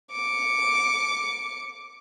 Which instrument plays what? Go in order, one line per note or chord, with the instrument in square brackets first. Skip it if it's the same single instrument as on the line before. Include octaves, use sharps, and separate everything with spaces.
[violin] D6 C#7